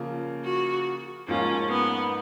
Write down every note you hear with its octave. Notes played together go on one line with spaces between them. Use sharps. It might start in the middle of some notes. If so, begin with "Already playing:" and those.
Already playing: C#3 F3 A#3
F#4
G#2 F3 A#3 C#4 F4
B3